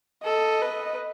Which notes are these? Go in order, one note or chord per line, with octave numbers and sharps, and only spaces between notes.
A4 D#5
B4